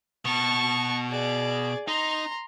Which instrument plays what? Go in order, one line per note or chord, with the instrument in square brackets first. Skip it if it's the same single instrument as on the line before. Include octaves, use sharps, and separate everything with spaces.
[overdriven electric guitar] B2 [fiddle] A5 C#6
[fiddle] G#4 D5
[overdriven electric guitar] D#4 [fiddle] A#5 C6